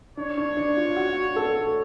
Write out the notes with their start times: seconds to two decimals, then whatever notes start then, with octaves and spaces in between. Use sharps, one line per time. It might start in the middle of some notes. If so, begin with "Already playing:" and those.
0.17 D4 C#5
0.38 D4
0.57 D4
0.77 F4
0.96 F#4
1.36 A4